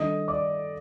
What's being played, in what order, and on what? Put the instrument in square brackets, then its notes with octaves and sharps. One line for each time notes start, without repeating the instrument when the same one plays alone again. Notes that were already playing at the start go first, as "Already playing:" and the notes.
Already playing: [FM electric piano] D#3 G3 D4 A4 [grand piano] D#5 D#6
[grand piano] D5 D6